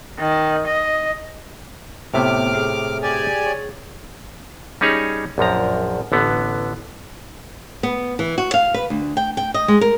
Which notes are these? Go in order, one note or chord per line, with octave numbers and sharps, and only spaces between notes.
D#3
D#5
A2 C3 B3 E5 D6 F6
G#4
G4 D5 G#5
C#5
G3 C#4 D#4 G#4 C#5
A#1 F#2 F3 A#5
A1 D3 B3
B3
E3
F#4
F5
B4
D2
G5
G5
D#5
G#3
A#4